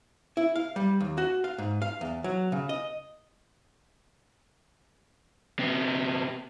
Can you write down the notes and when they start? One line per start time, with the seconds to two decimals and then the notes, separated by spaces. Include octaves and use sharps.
0.37 E4
0.56 F5
0.76 G3
1.00 D#2
1.18 F#4
1.44 F5
1.58 G#2
1.82 F5
2.01 E2
2.24 F#3
2.52 C#3
2.69 D#5
5.59 C3 B3